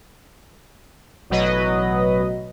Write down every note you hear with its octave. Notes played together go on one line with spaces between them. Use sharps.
A1 B2 F#3 B4 D#5